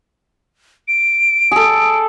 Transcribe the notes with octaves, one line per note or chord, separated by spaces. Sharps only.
D7
G#4 A4